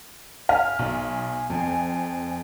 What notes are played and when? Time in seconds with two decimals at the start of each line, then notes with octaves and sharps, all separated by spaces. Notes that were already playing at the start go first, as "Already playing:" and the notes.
0.49 F5 G#5 F6
0.79 B1
1.50 F2